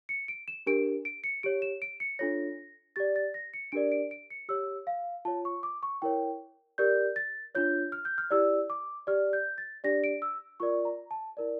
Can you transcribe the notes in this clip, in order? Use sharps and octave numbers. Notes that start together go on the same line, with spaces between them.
C#7
D7
E7
D4 G4 A#4 D7
D7
C#7
G4 C#5 D7
E7
D7
C#7
D4 F4 A4 C#5 A#6
G4 D5 A6
A6
A#6
C#7
D4 G4 A#4 D5 D7
D7
D7
C#7
G4 C#5 E6
F5
F4 C#5 A5
C#6
D6
C#6
E4 A#4 C#5 G5
G4 A#4 D5 G6
A6
D4 F4 C#5 G6
F6
G6
F6
E4 G4 D5 E6
D6
G4 D5 F6
G6
A6
D4 G4 D5 A#6
D7
E6
F4 A#4 D5 C#6
A#5
A5
E4 A#4 D5